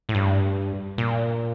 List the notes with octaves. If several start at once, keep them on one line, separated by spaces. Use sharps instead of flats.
A2
G2
A#2